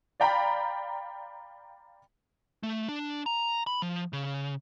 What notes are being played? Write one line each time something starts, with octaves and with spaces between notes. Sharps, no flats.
D5 F5 G5 A#5 B5
A3
D4
A#5
B5
F3
C#3